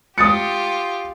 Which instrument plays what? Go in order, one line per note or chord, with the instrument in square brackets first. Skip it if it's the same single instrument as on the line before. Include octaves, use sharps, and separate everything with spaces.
[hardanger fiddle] F4 G4 [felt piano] D#6 A6 C#7